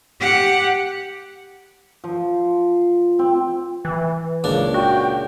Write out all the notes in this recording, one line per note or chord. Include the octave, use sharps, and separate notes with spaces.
G4 F#5
F3
C4
E3
C#2 A#2 D4
F#4 G5